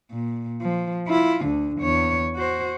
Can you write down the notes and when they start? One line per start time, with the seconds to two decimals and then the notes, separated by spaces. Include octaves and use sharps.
0.12 A#2
0.61 F3
1.07 E4 F4
1.45 D2 D3
1.81 E2 C#5
2.35 F#4 C5